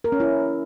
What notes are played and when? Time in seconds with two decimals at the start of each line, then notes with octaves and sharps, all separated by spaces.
0.04 A#4
0.12 C#4
0.20 E4